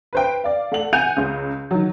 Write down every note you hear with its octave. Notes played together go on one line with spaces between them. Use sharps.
B4 C5 G5
D5 F5
A3 F#5 F#7
F#5 G#5 G6 D#7 F7
C#2 C#3
D#3 F#3